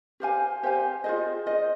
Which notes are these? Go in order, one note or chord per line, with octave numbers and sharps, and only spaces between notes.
G4 C5 F5 G#5
G4 C5 F5 G#5
F4 G#4 C5 D#5
F4 G#4 C5 D#5